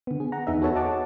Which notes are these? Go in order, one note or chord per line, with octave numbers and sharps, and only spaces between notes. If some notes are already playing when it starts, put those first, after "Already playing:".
D3 B3
G#4
F#5 A#5
E2 B3 D#4 G#4 E5
F#4 A4 B4 C#5 F#5 A5
D#5 F#5 A5 D6